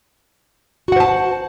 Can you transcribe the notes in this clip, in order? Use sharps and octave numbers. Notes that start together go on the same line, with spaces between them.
F#4 C5 F#5 A5